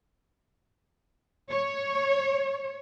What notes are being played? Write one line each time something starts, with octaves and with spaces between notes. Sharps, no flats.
C#5